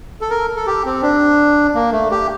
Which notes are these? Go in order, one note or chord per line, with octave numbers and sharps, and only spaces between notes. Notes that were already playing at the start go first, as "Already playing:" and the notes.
A4
A#4
A4
G4
C4
D4
A#3
A3
G4